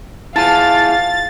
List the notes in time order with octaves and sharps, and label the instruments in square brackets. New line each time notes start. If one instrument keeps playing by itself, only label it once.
[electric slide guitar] E4 G#4 [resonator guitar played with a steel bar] F4 A5 [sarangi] F5 [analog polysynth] A6